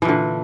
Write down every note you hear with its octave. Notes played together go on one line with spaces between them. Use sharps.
A#2 D3 E3